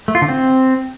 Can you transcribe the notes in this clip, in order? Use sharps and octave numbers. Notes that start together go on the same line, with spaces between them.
A3
F4
D3
C4